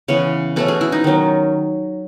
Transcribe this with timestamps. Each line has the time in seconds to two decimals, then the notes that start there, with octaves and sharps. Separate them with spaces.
0.08 C#3 E3 B3 C#5
0.56 B2 A3 C#4 A4
0.68 G#4
0.81 E4
0.92 D#4
1.04 D#3 F#3 C#4